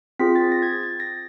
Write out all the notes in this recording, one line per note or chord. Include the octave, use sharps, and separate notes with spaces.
C4 F4 G#4 B6
A6
A#6
G#6
A6
A6
A#6